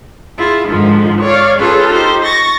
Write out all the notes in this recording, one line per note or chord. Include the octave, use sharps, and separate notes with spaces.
E4 F4 G#4
G#2 D3 D#3 F3
C#5 D5 F5
C#4 F4 G#4 A4 B4
D#4 G4 C5
C#6 A6 A#6